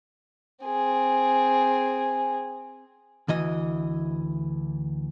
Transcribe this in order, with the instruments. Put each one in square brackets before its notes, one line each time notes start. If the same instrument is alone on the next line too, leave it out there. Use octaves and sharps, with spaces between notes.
[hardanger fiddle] C4 G#4
[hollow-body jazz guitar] D2 E3 D#5